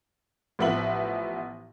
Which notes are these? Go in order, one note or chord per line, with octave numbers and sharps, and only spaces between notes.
A1 F3 B3 E5 F#7